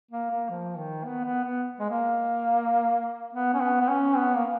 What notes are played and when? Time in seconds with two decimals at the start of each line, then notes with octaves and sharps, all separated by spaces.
0.11 A#3
0.30 A#3
0.50 F3
0.77 D#3
1.05 B3
1.24 B3
1.44 B3
1.79 G#3
1.90 A#3
3.33 B3
3.54 C#4
3.61 B3
3.81 B3
3.89 C#4
4.17 B3
4.35 A#3